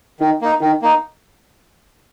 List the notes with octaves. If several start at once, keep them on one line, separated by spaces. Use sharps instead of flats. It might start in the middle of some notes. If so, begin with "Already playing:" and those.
D#3 D#4
A#3 D#4
D#3 D#4
A#3 D#4